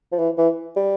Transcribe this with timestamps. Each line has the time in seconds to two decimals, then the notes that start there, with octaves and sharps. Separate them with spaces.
0.12 F3
0.19 E3
0.38 E3
0.76 G3